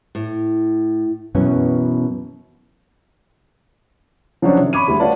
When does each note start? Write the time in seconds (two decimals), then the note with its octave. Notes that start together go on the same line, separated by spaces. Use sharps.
0.15 A2
1.35 F#2 B2 E3 B3 C#4
4.42 F3 F#3 C#4 D4
4.58 C3 D#3
4.73 B5 C#6 D6 G#6 D#7
4.87 D2 G3 B5
5.00 F4 F#4 B4 C#5 D5 A5